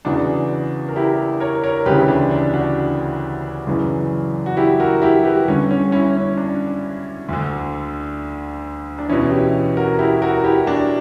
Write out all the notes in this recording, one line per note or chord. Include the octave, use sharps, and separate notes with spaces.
E2 C#3 E3 D4 F#4
A#4
E4 G4
A#4 C#5
A#4 C#5
D2 C#3 E3 G4 B4
E4
D4
D4
D4 F#4
F#2 C#3 E3
F#4
E4 G4
F#4 A#4
E4 G4
G4 B4
G2 D3 C#4
C#4
C#4 E4
C#4
D4
D2 D3
D4
E2 B2 C#4 E4
E4 G4
F#4 A#4
E4 G4
F#4 A#4
E4 G4
D4 F#4